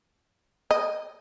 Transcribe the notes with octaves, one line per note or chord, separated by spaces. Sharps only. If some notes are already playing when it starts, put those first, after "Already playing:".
D#5